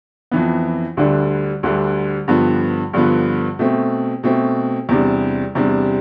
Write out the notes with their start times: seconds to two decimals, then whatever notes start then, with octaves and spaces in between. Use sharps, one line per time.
0.31 F2 E3 B3
0.97 D2 D3 G3 D4
1.63 D2 D3 G3 D4
2.28 G2 D3 F3 B3
2.93 G2 D3 F3 B3
3.59 B2 A3 C4
4.23 B2 A3 C4
4.89 E2 C3 G3 D4
5.55 E2 C3 G3 D4